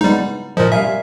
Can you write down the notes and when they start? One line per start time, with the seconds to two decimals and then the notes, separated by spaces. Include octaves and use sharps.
0.01 G3 G#3 B3 D#4
0.57 A#2 F3 A#4 D#5
0.72 G3 E5 F5 G#5